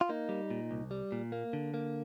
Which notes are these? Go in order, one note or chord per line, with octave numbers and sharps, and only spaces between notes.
F4
A#3 D#4
G3
A#2
C2
G3
A#2
A#3
D3
A#3